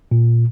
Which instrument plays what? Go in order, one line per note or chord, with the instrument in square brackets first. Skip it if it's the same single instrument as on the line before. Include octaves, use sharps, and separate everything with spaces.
[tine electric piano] A#2